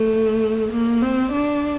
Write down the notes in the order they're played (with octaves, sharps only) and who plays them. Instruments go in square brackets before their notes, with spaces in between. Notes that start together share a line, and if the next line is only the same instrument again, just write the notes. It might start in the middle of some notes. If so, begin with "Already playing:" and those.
Already playing: [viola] A3
A#3
C4
D4